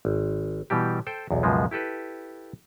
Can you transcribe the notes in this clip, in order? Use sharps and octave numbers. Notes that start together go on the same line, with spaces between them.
G#1
B2 E3 G3 G4
A4 C5 G5
B1 E2
C#2 F#2 B2 F3 G#3
E4 G4 A4 B4